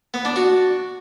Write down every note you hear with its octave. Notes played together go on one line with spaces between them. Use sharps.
B3
D4
F#4